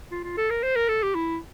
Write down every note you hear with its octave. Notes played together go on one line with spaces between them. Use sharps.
F4
F4
A4
A#4
C5
A#4
A4
G4
E4